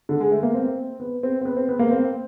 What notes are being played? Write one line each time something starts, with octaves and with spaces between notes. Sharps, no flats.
D3
G#3
A3
A#3
C4
B3
C4
C4
B3
C4
B3
A#3
C4